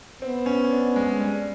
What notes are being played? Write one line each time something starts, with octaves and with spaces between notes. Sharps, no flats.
B3 C4
C#4
D4
G#3
G3